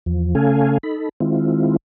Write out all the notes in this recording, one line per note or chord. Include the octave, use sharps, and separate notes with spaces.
E2 F3
C#3 A3 C#4 A4 F5 G#5
D#4 A4 B5
D#3 G#3 C4 E4 F4